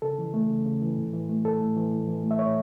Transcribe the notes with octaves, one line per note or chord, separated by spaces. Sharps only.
C#3 A4
E3
A3
C#3
C#3
E3
A2
E3
A3
A2 A4
A2
E3
A2
E3
A3
E5
A2 C#5